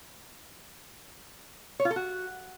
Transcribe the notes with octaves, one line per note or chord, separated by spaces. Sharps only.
C#5
F4
A4
F#4